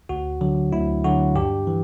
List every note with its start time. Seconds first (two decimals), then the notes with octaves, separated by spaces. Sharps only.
0.09 D2 F#4
0.41 D3 F#3
0.72 D2 E4
1.05 D3 F#3 F#4
1.36 G2 G4
1.67 E3